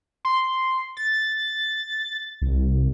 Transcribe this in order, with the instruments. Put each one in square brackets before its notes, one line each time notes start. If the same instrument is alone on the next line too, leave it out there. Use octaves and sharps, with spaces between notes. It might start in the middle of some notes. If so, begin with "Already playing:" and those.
[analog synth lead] C6
A6
[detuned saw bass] C2